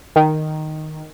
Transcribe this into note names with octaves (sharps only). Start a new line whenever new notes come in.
D#3